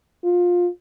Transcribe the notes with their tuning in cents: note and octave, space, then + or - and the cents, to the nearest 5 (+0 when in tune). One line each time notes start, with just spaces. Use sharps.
F4 +20